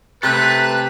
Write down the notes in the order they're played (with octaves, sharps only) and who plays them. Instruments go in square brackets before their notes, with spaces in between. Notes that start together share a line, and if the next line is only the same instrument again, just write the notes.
[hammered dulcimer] C3 [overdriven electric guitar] A4 E5 [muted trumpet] B4 [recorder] F#6